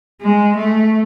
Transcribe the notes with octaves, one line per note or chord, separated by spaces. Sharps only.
G#3
A3